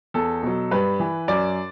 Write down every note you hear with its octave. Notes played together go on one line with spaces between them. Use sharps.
E2 A4
B2 F#3
G2 B4
E3
F#2 D5